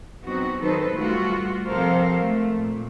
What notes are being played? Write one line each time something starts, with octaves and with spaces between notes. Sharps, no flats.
F#3 B3 C4 D#4 F#4
D#3 F#3 D#4 A4 B4 C5
G3 A3 F4 F#4
C3 F3 A4 A#4 C5 F5
A3
A#2